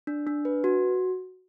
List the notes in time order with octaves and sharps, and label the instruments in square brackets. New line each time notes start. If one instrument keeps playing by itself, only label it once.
[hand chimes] D4
D4
B4
F#4